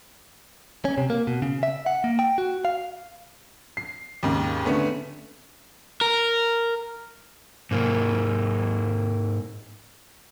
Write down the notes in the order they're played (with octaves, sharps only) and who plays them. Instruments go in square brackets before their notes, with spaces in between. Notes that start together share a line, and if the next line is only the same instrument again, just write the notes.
[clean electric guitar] C#4
C3
A#3
B2
C#3
E5
F#5
A#3
G5
F#4
F5
[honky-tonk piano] C7
D#2 G#2 C#3
D3 A3 B3 C#4
[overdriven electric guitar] A#4
[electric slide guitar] G#2 A#3